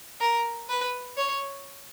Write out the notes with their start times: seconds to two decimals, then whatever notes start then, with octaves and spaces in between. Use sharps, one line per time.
0.21 A#4
0.69 B4
1.17 C#5